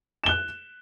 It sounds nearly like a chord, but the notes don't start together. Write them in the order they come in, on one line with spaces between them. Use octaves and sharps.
E7 G7 F#6